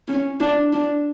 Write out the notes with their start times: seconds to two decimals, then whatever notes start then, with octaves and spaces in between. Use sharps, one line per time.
0.08 C#4
0.40 D4
0.73 D4